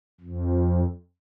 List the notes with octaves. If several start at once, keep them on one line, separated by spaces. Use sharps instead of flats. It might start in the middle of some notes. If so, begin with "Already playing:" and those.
F2